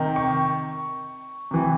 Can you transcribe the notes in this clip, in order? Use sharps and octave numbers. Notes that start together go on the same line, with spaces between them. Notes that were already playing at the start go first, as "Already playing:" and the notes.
Already playing: C3 D#3
C#6
C3 E3